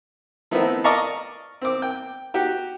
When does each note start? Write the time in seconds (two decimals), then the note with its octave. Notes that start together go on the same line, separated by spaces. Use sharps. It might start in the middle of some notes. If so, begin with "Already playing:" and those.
0.51 F3 A3 B3 C4 D#4 E4
0.84 D5 D#5 F5 A5 A#5 C#6
1.62 C4 D6
1.82 G5
2.34 F#4 G4